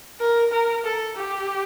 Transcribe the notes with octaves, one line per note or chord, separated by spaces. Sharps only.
A#4
A#4
A4
G4